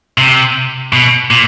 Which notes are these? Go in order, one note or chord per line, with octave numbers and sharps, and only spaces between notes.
C3
B2
A#2